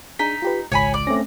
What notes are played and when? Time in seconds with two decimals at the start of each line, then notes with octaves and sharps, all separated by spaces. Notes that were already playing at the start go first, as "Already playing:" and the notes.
0.19 D4 D#4 G#4 B6
0.42 F4 G4 B4
0.72 G#1 C#2 C#5 G#5 B5
0.94 D5
1.07 A3 C4 C#4 A#6